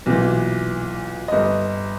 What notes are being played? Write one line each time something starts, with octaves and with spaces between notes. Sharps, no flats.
B1 A#2 E3
G1 D#5